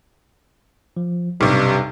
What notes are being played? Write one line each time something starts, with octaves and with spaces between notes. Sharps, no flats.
F3
B1 G2 C3 G4 C#6 D6